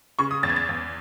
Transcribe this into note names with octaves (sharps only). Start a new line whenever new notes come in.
C#3 C#6
D#6
E2 A6
G#6
A6
E2